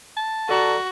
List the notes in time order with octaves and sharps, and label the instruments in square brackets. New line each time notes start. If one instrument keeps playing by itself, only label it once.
[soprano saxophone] A5
[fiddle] F#4 [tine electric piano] A4 D5 A#5